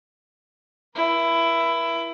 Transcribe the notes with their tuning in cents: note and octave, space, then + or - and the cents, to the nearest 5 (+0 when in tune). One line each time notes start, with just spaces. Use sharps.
E4 +15 B4 -45